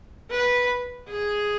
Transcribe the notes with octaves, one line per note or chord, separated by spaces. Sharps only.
B4
G#4